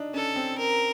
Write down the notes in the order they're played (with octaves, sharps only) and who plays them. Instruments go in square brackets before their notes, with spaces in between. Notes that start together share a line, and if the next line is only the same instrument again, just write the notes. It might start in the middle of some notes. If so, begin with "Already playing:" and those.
Already playing: [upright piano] D4 D#4
[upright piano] C#4 [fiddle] A4
[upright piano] C4
[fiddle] A#4